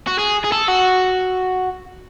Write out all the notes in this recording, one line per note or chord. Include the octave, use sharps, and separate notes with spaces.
F#4
G#4
G#4
A4
F#4